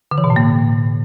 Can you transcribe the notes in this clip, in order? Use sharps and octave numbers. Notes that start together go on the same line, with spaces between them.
D3
E3
B2
A2
A#3